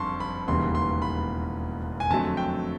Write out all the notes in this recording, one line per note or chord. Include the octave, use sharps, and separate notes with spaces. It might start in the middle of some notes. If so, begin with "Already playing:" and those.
Already playing: F#1 F2 D3 G3 A5 C6 C#6
B5
E1 D#2 C#3 E3 G3 C6
C6
B5
G#5
F2 D3 F#3 A3 A5
G5